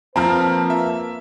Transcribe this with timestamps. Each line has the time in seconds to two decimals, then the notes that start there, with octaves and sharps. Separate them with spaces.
0.16 F3 A#3 C4 F4 B4 A5 A#5 F6
0.70 E5